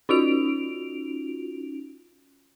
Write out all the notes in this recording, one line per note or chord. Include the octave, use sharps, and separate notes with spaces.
C#4 D#4 F4 F#4 D7 F7